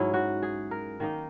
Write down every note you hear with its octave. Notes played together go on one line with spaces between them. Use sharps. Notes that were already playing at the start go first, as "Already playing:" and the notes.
Already playing: G#2 F#3 C#4 E4
F#4
G#4
A#4
D#3 A#3 D#4